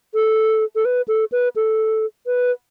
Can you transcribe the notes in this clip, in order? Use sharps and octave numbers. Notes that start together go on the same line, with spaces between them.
A4
A4
B4
A4
B4
A4
B4